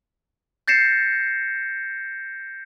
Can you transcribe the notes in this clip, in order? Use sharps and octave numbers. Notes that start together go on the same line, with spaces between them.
G6 A6 A#6 C7 C#7 E7